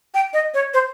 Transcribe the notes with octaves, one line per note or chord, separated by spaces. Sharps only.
G5
D#5
C#5
C5